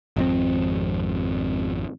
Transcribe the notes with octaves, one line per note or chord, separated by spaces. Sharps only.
G#1 F2 C4